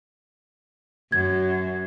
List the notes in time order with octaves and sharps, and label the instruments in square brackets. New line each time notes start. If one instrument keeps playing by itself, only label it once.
[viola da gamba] F#2 [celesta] G#6